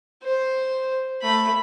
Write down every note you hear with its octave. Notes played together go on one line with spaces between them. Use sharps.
C5
A3 B5